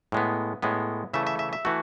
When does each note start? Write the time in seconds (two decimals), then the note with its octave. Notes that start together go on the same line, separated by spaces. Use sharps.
0.12 A2 G#3 B3
0.62 A2 G#3 B3
1.14 C#3 E3 A3 E5
1.27 E5
1.39 E5
1.53 E5
1.65 E3 A3 F#4